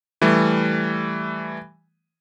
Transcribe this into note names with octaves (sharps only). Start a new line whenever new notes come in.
E3 G3 A3